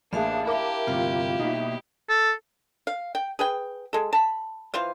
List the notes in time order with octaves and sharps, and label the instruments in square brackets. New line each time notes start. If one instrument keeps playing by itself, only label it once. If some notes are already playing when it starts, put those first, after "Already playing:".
[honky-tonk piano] A1 A#3 G#4 [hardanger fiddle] D4 [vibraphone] E5 F5 A5
[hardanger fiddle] E4 G4 [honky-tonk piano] A#4 D6
[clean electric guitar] D2 G2 C3 [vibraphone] F4 F5
[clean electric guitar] B2 A#3 E5 [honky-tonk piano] D#4
[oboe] A4
[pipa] F5
G5
G#4 B4 G5
G#3 A4
A5 B5
E3 F4 C5 F5